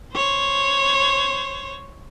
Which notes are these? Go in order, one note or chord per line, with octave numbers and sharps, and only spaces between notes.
C5 C#5